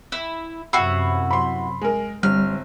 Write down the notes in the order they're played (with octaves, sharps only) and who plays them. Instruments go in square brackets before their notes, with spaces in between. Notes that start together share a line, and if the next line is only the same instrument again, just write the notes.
[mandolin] E4
[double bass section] F#2 C3 [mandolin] E4 F#4 [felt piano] B5 E6 C7
[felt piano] B5 C6
G#3 A#4
[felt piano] G1 [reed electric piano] G3 [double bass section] C4 [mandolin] F6